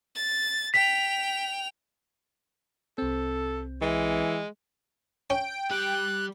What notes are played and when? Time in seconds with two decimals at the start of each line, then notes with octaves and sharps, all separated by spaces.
0.15 A6
0.74 G5 B6 F7
2.98 C2 C4 A4
3.82 E3 G#3
5.30 C#4 G5
5.71 G3 G4 F#6